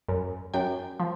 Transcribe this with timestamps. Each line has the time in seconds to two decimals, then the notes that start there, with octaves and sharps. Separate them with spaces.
0.08 F#2
0.54 F#2 G5
1.00 F3